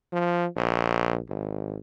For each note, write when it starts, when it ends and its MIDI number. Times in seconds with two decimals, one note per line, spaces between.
0.13 0.46 53
0.56 1.18 34
1.29 1.78 32